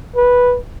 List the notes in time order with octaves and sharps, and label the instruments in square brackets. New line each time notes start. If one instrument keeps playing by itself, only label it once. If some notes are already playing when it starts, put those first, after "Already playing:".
[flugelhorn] B4